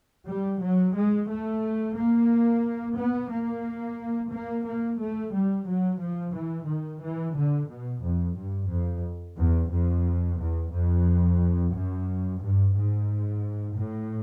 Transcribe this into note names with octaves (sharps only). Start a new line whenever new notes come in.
G3
F#3
G#3
A3
A#3
B3
A#3
A#3
A#3
A3
G3
F#3
F3
E3
D#3
E3
D3
B2
F2
G2
F2
E2
F2
E2
F2
F#2
G2
G#2
A2